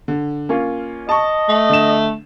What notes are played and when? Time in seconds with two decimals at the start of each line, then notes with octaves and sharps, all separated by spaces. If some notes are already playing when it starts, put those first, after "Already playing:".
0.08 D3
0.49 A#3 C#4 F4
1.09 D#5 A5 C#6
1.48 A3
1.70 D3 E7